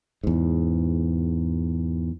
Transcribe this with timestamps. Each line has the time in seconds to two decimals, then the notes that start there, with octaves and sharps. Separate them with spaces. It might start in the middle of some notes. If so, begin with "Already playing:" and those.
0.24 E2 G#2